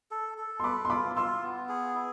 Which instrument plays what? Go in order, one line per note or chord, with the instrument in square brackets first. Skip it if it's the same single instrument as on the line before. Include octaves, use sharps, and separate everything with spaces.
[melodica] A4
A4
[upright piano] C6
[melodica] B4 [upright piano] B5 D6
[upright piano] C6
[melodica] F4 [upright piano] B5 D6
[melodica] F4 [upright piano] C6 E6
[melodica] B3
G#4
E4